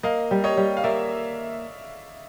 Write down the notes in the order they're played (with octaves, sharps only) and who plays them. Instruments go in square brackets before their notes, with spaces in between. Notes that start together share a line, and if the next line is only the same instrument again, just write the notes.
[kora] A#3 [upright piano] D#5 F5
[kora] G3
[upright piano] C#5 D#5
[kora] G3
[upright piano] F5
[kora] A#3 [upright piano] D5 E5